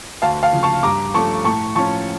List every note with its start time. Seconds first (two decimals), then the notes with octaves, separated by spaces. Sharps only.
0.22 D2 F5 A5
0.43 F5 A5
0.53 C#3 F3
0.63 A5 C#6
0.83 G2 A#5 D6
1.14 F3 A3 C#4 A5 C#6
1.45 A2 A5 C#6
1.75 F3 C#4 A5 C#6